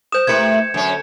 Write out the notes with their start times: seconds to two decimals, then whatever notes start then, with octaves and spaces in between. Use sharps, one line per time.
0.12 C5 D#6 G6 E7
0.27 C3 A3 E4 A#4 B4 G#6 C#7
0.74 F#2 D3 C#4